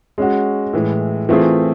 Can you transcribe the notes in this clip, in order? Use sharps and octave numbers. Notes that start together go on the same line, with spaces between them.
G#3 C#4 F#4
A2 E3 G#3
E3 A3 C4 F4 G#4